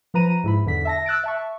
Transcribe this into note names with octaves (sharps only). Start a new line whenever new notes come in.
F3 B4 A#5 D#7
G#2 E4 B5
E2 D3 B6
E5 A5 A#6
E6 F#6 A6 D7
E5 A5 C#6